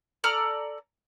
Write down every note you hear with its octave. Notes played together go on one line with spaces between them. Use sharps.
A4 D5 A#5 F6